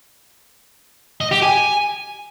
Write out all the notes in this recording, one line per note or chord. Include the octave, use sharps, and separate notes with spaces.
D#5
G4
G#5